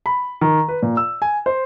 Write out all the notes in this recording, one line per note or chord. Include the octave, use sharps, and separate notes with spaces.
B5
D#3
B4
A#2
E6
G#5
C5